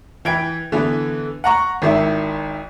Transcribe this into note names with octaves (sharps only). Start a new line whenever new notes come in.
E3 B4 G5 G#6 D7
D3 E3 B3
F#5 A#5 C#6
G#1 D#3 E4